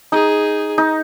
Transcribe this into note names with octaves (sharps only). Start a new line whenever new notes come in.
D#4 G#4
D#4